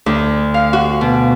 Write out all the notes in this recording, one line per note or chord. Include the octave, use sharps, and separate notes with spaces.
D2
F5
F#4
B2